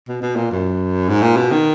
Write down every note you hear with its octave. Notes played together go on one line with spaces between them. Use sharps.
B2
B2
A#2
F#2
G#2
A#2
B2
D#3